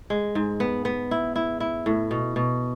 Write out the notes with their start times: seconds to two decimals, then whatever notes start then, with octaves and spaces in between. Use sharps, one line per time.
0.10 G#3
0.35 G#2
0.60 B3
0.85 B3
1.11 E4
1.36 E4
1.60 E4
1.86 A2
2.11 B2
2.36 B2